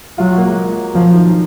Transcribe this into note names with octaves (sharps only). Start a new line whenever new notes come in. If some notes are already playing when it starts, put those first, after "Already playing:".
F#3 F4
F#4
A#3
G#3
F3 F#3
D#3